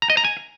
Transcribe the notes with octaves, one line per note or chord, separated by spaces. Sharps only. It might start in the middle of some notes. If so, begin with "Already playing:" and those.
A#5
D#5
A#5
G#5